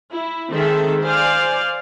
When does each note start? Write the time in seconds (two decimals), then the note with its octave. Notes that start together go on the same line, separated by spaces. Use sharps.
0.11 E4
0.53 D#3 G#3 C4 G#4 A4 E5
1.04 C5 D5 F5 G#5